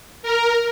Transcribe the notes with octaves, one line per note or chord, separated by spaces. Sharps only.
A#4